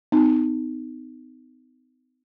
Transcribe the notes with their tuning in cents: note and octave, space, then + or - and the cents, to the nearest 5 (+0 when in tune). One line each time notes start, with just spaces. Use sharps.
B3 +45 D#4 -5